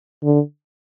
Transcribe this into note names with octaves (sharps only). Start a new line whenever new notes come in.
D3